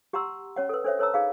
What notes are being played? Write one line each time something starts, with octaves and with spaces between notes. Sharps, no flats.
G4 F#5 A#5 C6 E6
C#4 C#5 F#5
A4 B4
D4 A4 C5 C#5 E5
A4 B4 C#5 A5 A#5 E6
D#4 G#4 F5 B5